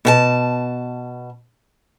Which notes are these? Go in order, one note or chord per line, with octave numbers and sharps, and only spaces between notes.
B2 E5 A5